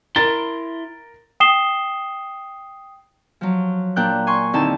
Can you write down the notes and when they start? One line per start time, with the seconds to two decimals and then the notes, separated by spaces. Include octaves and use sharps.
0.16 E4 A#4 C6 A6
1.40 G5 D#6 C7 E7 G7
3.41 F3 F#3
3.96 A#2 D4 G5 F#6 G6
4.27 G#5 C6 C#6
4.53 D#2 D3 C4 D#4 E4 A5